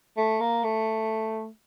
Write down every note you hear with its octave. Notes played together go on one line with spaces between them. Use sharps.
A3
A#3
A3